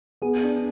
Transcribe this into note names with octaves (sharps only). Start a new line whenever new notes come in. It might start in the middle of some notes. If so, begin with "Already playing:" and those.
B3 G#4
D4